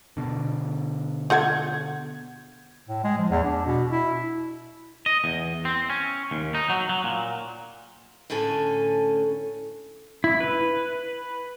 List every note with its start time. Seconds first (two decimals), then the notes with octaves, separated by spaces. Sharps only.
0.17 B2 D3
1.30 F4 A4 F#5 G6 G#6
2.89 A2
3.04 G#3
3.19 F3
3.30 E2
3.44 D4
3.66 B2
3.91 E4
5.06 D#5
5.24 E2
5.65 C4
5.90 C#4
6.31 D#2
6.55 D#4
6.70 F#3
6.89 F#3
7.04 A#2
8.30 A2 D3 C#4 A4 G#5
10.24 E4
10.40 B4